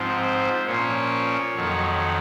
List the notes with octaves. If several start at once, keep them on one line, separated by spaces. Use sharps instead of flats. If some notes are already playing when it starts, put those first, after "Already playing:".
Already playing: G#2 F3 C4
C5
A#2 F3 A#3 C#4 C#5
F2 D#3 F#3